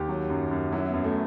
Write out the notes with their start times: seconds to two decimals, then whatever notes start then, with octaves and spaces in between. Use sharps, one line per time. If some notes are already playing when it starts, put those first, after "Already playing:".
Already playing: D#2 G4
0.09 F#3
0.30 F#2
0.51 F#2
0.72 F#3 E4
0.89 B3
0.94 F#2
1.04 A3